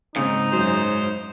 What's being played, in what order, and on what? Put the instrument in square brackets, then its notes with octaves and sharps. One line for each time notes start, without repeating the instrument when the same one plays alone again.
[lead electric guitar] G#2 [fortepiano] C#3 C4 [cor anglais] D#4
[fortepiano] F#2 F#3 [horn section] C#3 C5